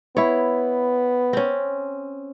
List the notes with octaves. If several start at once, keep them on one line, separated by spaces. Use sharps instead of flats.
B3 E4 C#5
C4 C#4